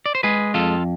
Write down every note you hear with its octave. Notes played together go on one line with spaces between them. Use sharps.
D5
C5
G#3 G#4 B4
F2 F4 A4